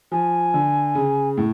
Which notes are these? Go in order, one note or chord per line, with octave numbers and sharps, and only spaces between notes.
F3 G#5
D3
C#3
A2